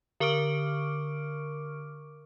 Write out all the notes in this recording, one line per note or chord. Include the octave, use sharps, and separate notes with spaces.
D3 A#4 C#6 D6 F6 D7